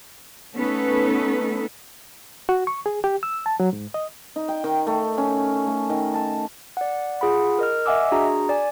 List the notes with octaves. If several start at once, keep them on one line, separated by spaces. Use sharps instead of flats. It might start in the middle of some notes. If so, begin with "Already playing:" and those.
A3 B3 C#4 D#4 A4 B4
F#4
C#6
G#4
G4
E6
A5
F#3
G#2
D#5
D#4
G5
D#3
A3
C#4
A3
D#3
A5
D5 F#5
F4 G#4 F#5 B5
A#4 D#5 F6
D#5 E5 F#5 G#5 D6 E6
D4 F#4 G#4 A#5
D5 G#5